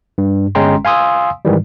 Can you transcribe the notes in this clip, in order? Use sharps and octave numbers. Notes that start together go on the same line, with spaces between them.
G2
G1 G#3 C#4 G5 A#5 C6
F5 G#5 C6 D#6 E6
G#2 D#3 E3 G3